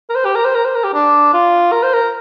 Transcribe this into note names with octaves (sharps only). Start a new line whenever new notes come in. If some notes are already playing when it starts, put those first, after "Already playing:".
A#4
C5
G4
A#4
C5
A#4
C5
A#4
G4
D4
F4
A#4
C5
A#4